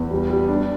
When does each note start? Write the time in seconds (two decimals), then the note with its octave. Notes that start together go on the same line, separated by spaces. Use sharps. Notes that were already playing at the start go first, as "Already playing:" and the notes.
Already playing: E2
0.11 G3
0.30 G3
0.48 D4